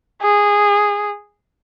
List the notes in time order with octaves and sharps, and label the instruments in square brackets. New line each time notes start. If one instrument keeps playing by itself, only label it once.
[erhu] G#4